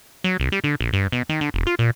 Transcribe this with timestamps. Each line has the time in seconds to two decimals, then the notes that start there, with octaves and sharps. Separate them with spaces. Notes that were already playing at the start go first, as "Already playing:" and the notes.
0.24 F#3
0.40 C2
0.52 G3
0.64 D3
0.81 A#1
0.93 G2
1.12 B2
1.29 D#3
1.41 D3
1.54 E1
1.67 F4
1.79 A#2